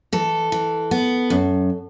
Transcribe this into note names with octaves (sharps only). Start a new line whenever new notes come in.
E3 A4
E3
B3
F#2